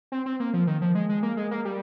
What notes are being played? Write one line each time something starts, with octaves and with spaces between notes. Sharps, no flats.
C4
C4
A#3
F3
D#3
F3
G#3
G#3
A#3
G#3
A#3
G3